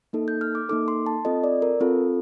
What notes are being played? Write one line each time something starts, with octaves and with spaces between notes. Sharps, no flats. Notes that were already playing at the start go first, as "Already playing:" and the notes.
A#3 D#4 A4
G6
F6
D6
A#3 D#4 A4 D6
C6
A5
C4 F4 A4 D#5
D5
A#4
C4 F4 A4